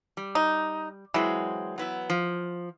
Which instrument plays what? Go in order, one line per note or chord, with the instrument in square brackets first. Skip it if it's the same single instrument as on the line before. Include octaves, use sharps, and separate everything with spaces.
[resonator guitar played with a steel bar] G3
[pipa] D#4
[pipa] E3 [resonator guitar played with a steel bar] F#3 G#3 C4
[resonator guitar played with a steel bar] F#3 B3 E4
F3